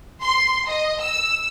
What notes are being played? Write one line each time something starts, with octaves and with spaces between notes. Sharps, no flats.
C6
D#5
E6